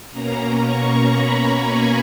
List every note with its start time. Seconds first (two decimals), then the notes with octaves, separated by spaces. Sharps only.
0.11 B2 A#3 C#4 A#5
0.62 C#6
1.12 B5
1.63 G#5